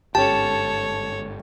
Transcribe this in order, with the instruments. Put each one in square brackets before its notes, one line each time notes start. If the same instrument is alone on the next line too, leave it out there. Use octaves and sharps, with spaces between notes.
[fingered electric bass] G1 G#2 [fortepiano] C#4 G4 [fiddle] A4 C#5 [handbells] A5